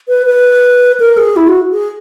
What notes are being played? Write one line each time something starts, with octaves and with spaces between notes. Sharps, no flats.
B4
B4
A#4
G#4
E4
F#4
G#4